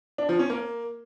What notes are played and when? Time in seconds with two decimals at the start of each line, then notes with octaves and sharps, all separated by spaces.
0.18 D4
0.29 F3
0.39 C#4
0.50 A#3